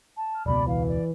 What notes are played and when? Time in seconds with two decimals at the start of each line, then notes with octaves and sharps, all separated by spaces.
0.16 A5
0.34 F6
0.46 E1 C#2 B2 D5 B5
0.67 E3 F5
0.88 D5